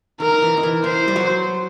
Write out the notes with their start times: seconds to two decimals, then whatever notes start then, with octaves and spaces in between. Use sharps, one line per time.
0.20 D#3 A#4
0.42 E3
0.57 D#3
0.63 E3
0.84 E3 C5
1.08 G3
1.16 F#3